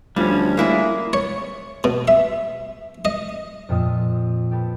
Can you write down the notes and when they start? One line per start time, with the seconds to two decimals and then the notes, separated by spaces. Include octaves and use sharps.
0.16 D2 D3 F3 G3 C#4
0.57 G#3 A#3 E4 G#4
1.13 C#5
1.84 B2
2.08 E5
3.05 D#5
3.69 F2 A#2 F4 E5 D#6
4.51 G4 A4 B4